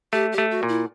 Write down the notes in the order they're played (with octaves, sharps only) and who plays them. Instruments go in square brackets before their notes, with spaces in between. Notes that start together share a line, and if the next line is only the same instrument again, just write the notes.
[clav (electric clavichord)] A3 [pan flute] G4
[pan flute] G4
[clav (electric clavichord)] A3
[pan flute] F#4
[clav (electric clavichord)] A#2
[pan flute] E4